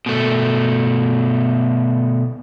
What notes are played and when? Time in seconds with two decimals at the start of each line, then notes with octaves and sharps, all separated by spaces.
0.06 B2 A3